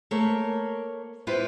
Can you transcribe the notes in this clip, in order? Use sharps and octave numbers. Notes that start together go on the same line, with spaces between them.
A3 A#3 A#4 C#5
E4 F4 G4 B4 C5